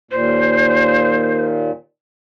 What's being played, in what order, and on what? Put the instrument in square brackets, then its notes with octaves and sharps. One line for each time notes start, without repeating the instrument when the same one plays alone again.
[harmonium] D#2 A#2 [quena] C5